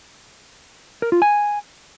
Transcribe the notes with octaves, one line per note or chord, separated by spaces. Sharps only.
A#4
F4
G#5